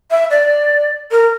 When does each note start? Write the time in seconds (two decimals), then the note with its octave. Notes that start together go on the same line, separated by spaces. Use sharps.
0.11 E5
0.30 D5
1.11 A#4